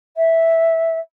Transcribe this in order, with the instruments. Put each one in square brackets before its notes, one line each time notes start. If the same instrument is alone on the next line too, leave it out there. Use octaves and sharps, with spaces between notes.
[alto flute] E5